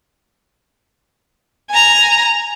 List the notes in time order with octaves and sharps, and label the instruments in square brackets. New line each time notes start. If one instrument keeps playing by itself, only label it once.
[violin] G#5 A#5